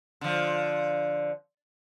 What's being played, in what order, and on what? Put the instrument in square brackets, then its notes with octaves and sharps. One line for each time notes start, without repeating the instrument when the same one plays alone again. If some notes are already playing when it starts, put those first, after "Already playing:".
[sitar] D3 F3